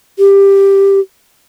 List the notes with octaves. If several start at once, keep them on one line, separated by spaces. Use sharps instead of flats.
G4